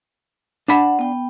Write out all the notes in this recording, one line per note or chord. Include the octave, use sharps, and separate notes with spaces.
D4 F#5 A5 B5
B3 G5